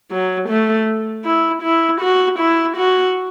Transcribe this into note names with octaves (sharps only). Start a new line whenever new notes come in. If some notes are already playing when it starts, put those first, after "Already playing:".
F#3
A3
E4
E4
F#4
E4
F#4